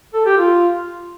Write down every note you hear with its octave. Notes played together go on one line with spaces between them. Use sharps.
A4
G4
F4